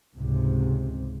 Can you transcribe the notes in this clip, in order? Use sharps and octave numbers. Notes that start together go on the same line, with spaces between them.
C#2 G#2 C3